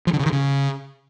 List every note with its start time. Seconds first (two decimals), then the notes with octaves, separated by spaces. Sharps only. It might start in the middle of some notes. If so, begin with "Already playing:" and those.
0.07 F3
0.13 D3
0.20 C#3
0.26 D#3
0.32 C#3